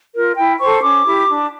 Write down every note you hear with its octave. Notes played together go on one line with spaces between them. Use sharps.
F4 A#4
E4 G5
A4 C5 C#6
C#4 D6
E4 G4
D4